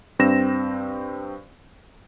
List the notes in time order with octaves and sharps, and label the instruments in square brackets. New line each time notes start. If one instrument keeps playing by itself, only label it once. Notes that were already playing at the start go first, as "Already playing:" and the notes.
[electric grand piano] G2 C4 A#6 E7